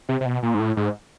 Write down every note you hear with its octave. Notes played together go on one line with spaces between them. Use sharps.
C3
C3
B2
A#2
G#2
A2
G#2